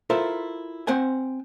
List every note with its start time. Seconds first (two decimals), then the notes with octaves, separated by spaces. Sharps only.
0.10 E4 F4 A4 A#4 C5 E5
0.87 C4 C5 F#5 G#5